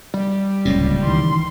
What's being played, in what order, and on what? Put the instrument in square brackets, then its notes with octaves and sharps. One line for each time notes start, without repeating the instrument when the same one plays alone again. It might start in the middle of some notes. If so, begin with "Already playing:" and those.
[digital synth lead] G3
[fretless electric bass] D1 C#4 [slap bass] C#2 A#2
[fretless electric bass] D#3 E3 [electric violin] C6